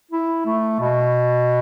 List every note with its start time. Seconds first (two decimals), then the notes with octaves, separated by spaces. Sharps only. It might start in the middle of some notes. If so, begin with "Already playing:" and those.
0.11 E4
0.46 A3
0.80 B2